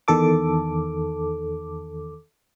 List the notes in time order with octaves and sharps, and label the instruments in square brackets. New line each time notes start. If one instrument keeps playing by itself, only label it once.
[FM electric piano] E2 D#3 A4 D6